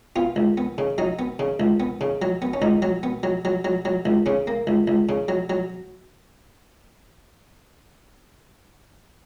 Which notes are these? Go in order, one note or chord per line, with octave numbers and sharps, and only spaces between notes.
B3 F4
C#2
B3
C#3
F#3 D#4
B3
C#3
C#2
B3
C#3
F#3
B3
C#4
C#2 D#4
F#3
B3
F#3
F#3
F#3
F#3
C#2
C#3 C#4
A#3
C#2
C#2
C#3
F#3
F#3